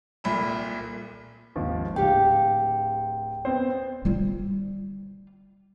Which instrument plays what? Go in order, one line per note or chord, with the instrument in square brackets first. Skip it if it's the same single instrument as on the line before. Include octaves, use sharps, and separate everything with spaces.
[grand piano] D#1 C2 A#2 B5
G#1 D#2 F3
[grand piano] D1 [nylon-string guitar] G4 F5 [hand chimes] G5
[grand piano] B3 C4 C5
[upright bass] G3 F4